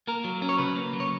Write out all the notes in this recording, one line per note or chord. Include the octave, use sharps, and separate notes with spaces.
A#3 A#4
F#3
C#4
C#5
C#3 B4
A#3
F#3
C#5